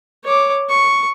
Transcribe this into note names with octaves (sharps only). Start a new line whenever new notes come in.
C#5 D6
C#6